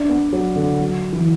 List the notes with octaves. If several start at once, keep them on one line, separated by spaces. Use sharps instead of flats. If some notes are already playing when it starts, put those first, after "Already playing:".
Already playing: D4
B3
F#3
D3
F#3
E3